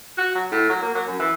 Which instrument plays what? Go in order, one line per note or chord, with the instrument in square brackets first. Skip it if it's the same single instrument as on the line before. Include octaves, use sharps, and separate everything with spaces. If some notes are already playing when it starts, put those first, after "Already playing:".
[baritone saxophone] F#4
F#3
A2
F#3
A#3
F#3
F#2
E3